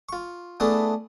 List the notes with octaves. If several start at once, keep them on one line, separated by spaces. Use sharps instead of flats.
F4 C#6
A3 B3 D4 E4 G#4 A4